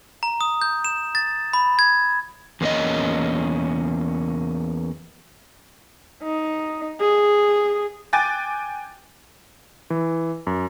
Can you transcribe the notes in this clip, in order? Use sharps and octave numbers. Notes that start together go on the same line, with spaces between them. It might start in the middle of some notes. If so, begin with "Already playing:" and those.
A#5
D#6
G6
E7
A6
B5
G#6
E2 A#3 C#4 D#5
D#4
G#4
G5 G#5 D6 F#6 A6
E3
F#2